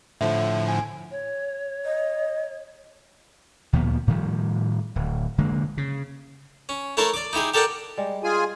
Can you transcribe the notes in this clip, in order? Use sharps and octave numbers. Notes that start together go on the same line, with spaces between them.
A2 D3 F3 E5
G#5
C#5
D#5
D2 A#2 F3 B3
A2 D#3 F3 G3
D1
F1 D3 G#3 A#3
C#3
C#4
A3 E4 A#4 C#5 A5 C6
D5 D6
D#4 E4 G4 G#4
G4 A4 A#4 D5 F#5 G5
G3 G#3
F4 G#4 G#5